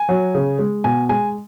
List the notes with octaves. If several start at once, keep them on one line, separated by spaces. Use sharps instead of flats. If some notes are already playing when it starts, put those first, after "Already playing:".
Already playing: G#5
F#3
C#3
G#3
B2 G#5
G#3 G#5